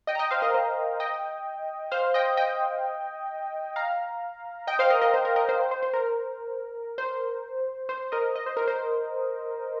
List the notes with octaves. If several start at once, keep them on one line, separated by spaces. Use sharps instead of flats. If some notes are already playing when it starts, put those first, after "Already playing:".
D#5 G5
A#5
D#5 G5
C5 F5
A#4 D#5
C5
D#5 G5
C5 F5
D#5 G5
D#5 G5
F5 A#5
D#5 G5
C5 F5
A#4 D#5
A#4 D#5
C5
A#4
A#4 D#5
C5
C5
C5
C5
A#4
C5
C5
A#4 D#5
D#5
C5
A#4
C5